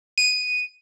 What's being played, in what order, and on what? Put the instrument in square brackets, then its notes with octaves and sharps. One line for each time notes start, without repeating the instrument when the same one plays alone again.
[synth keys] D#7